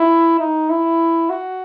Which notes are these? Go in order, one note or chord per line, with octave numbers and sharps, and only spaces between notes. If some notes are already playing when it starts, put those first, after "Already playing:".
Already playing: E4
D#4
E4
F#4